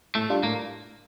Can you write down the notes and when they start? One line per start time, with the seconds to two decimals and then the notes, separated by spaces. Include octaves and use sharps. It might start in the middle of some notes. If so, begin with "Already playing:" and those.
0.15 A2 A3
0.30 G3 D4 F4
0.43 A2 A#3